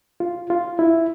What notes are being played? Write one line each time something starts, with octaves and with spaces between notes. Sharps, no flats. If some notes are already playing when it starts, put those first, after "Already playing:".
F4
F4
E4